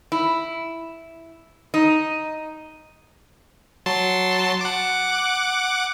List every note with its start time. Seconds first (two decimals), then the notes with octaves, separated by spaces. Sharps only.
0.12 E4
1.74 D#4
3.86 F#3 A5 C6
4.61 F#5 D6